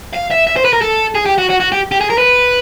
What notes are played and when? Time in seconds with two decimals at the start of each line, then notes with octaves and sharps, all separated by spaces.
0.13 F5
0.31 E5
0.47 E5
0.56 C5
0.65 B4
0.73 A#4
0.82 A4
1.15 G#4
1.26 G4
1.39 F#4
1.50 F#4
1.61 F#4
1.72 G4
1.92 G4
2.01 G#4
2.10 A#4
2.18 B4